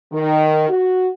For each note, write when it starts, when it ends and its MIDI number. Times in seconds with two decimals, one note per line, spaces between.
0.13 0.69 51
0.69 1.09 66